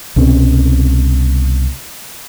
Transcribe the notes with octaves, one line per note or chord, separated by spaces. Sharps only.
C2 B2 C4 C#4